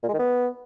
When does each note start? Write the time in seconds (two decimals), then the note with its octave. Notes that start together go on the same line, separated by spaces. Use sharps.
0.03 A#2
0.08 G#3
0.14 D#3
0.19 B3